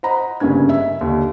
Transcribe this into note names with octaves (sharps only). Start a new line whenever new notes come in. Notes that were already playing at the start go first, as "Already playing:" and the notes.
C5 D#5 F#5 A#5 B5
G1 G2 C#3 A#3 C#4 G#6
E5
D#2 D3